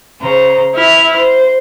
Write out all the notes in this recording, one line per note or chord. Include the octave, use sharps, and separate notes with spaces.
C#3 C5 A#5
E4 E5 F6
C5